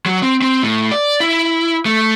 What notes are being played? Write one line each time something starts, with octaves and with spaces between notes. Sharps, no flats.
F#3
C4
C4
A2
D5
E4
A3